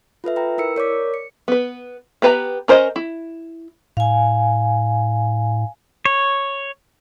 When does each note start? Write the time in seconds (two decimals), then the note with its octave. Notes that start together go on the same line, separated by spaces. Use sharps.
0.24 F4 A4 B4 E5
0.36 B4 G5 A#5
0.58 E4 A#4 E6 C#7
0.76 A#4 C#5 D5 D6 B6
1.14 C#7
1.48 B3 B4
2.22 B3 G4 B4 A5 A#5
2.68 C#4 A#4 C5 C#5 D#5
2.96 E4
3.97 A2 F5 G#5
6.05 C#5